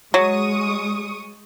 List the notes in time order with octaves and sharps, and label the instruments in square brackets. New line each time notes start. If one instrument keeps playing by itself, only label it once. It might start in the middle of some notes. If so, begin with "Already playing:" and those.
[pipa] F#3 [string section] G#3 C#6 D#6